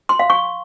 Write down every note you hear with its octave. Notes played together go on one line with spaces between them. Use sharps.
C6
F5
C#6